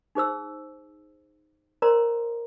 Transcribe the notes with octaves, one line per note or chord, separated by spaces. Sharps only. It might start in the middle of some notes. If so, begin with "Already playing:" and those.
D#4 G#4 C5 E6
A#4 C5 D5 A#5 C6